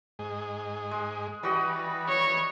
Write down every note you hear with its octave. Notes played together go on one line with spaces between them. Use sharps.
G#2 G#4 D#5
G#3
E3 G3 F#4 B4 D#5
C#5